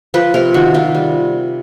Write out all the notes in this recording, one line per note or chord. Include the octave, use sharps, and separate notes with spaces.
F3 B4
C3 A#4
D#3 F#4
C3 F4
G3